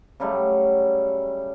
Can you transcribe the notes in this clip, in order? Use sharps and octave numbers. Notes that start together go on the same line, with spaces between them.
C#3 F#3 G3 A3